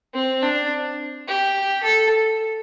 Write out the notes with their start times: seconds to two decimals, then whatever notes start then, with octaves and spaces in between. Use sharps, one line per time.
0.14 C4
0.42 D4
1.27 G4
1.83 A4